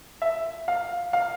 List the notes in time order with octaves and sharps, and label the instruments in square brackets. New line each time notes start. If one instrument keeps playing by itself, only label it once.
[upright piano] E5
F5
F5